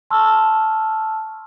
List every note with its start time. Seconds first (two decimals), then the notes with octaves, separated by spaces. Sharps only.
0.10 A5 C6 C#6 E6 F6